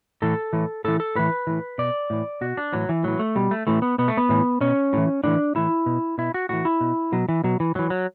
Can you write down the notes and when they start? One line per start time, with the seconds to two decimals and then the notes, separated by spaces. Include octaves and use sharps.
0.22 A2 E3 A4
0.53 A2 E3
0.84 A2 E3 A4
1.00 A4
1.15 A2 E3 B4
1.47 A2 E3
1.78 B2 D5
2.10 A2 E3
2.41 B2 F#4
2.57 D4
2.73 A2 E3 F#3
2.89 E3
3.04 A2 E3 F#3
3.19 A3
3.36 B2 G3
3.51 A3
3.67 A2 E3 A3
3.82 B3
3.98 B2 B3
4.08 A3
4.17 B3
4.29 A2 E3
4.61 B2 C#4
4.93 A2 E3
5.24 A2 E3 D4
5.55 A2 E3 E4
5.86 B2
6.18 B2 E4
6.34 F#4
6.49 A2 E3 F#4
6.65 E4
6.81 B2
7.12 B2 F#3
7.29 E3
7.44 B2 F#3
7.60 E3
7.75 A2 E3 F#3
7.90 F#3